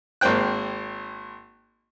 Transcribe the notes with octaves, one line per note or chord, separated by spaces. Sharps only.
G#1 A#3 C4 G5 F#6